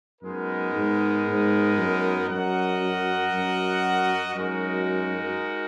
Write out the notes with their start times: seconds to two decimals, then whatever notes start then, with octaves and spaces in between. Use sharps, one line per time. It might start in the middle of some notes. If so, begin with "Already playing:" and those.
0.22 F#2 G#3 B3 D#4 A#4
0.73 G#2
1.25 G#2
1.77 F#2
2.28 F#2 F#4 A#4 D#5 F#5
3.32 F#2
4.34 F#2 G#3 D#4 F#4 A#4